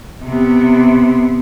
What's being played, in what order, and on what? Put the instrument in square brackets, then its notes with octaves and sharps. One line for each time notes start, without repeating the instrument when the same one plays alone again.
[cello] C3 B3